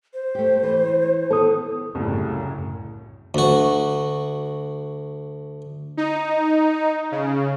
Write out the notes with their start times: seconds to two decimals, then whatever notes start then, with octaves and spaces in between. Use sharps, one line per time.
0.14 C5
0.35 A3 G4
0.63 E3
1.31 D#3 B3 A4 D#6
1.95 C2 F#2 A2 C#3
3.34 D2 F#4
5.97 D#4
7.12 C#3